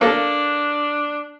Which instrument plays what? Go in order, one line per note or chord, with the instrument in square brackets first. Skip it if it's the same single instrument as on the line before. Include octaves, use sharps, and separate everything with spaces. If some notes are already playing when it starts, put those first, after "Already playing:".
[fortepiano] A#3 A4 [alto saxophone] D4